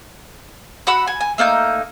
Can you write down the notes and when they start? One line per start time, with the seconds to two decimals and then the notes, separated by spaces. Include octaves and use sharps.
0.87 F#4 F#5 B5 E6
1.07 G#5
1.21 G#5
1.38 A3 A#3 D#4 G6